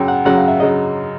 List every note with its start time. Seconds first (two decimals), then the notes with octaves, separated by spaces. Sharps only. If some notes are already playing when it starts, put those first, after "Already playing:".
Already playing: F#2 C#3 F#3 G5
0.08 F#5
0.25 F#2 C#3 F#3 F#5
0.38 F5
0.48 E5
0.60 C#3 F#3 D#5